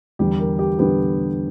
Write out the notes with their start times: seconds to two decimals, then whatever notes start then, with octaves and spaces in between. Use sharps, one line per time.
0.19 E2 D3 G3 B3 G4
0.40 A#4
0.59 G4
0.79 D3 G3 B3 G4